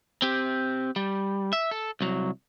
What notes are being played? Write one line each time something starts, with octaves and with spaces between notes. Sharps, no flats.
C4 G4
G3
E5
A4
C2 F#3